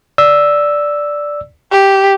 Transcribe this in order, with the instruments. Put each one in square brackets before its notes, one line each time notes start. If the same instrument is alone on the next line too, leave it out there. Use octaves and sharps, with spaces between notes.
[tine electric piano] D5 E6
[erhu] G4